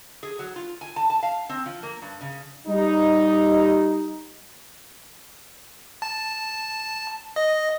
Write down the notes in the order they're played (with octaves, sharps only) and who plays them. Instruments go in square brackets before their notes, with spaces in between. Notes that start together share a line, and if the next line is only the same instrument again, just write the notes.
[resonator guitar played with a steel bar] G#4
F#3
F4
G#5
A5
A5
F5
C4
F3
A#3
G2
C#3
[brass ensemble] G3 D#4
[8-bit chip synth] A5
D#5